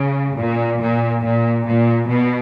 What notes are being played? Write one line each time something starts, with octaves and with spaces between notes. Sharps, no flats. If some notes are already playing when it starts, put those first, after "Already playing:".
Already playing: C#3
A#2
A#2
A#2
A#2
B2